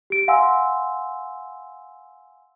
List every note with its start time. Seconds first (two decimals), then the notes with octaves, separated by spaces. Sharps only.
0.10 G4 D7
0.28 F5 F#5 G#5 C6 E6